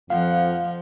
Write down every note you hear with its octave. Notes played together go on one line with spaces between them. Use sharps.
F2 F3 F4 F5 F#5